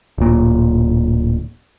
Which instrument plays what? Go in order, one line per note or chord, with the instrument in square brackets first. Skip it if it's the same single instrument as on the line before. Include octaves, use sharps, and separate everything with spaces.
[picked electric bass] D1 A#2